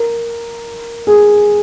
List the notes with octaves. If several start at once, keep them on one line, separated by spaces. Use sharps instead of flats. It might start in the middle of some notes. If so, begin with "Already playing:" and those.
Already playing: A#4
G#4